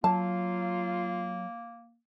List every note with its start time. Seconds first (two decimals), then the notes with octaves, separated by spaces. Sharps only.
0.04 F#3 A#3 F4 A5